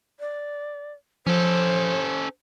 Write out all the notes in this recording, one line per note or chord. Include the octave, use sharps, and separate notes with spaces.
D5
F3 C#4 A4 C5